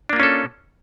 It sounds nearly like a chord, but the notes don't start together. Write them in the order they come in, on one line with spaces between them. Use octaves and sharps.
D4 A#3 F4 C#4 A4